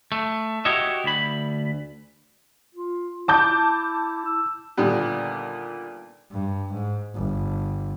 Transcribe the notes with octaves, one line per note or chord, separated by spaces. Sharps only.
A3
E4 F#4 G4 C#5 D#5 E5
D2 B5
F4
E4 A5 D6 G6
E6
A#2 D3 D#3 G3 B3 G4
G2
G#2
G1